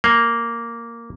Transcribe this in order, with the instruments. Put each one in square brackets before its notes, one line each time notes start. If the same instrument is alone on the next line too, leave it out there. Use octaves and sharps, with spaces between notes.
[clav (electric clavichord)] A#3